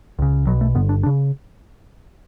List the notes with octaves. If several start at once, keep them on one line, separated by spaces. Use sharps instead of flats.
C#2 C#3
B1 B2 F#3
A3
G1 G2 D3 B3
D4
D4
C#3